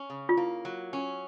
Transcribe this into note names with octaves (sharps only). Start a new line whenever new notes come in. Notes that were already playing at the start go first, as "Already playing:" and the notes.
Already playing: C#4
C#3
F4
A#3 E4
F#3
C#4